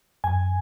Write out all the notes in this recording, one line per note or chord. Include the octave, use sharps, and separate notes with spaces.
F#2 G#5